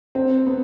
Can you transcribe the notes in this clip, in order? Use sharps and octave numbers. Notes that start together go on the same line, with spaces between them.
C4
B3